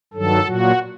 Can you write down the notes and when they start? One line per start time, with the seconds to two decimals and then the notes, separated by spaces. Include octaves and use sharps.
0.13 G2 D#3 F#3 A4
0.45 A#2 F#3 F#4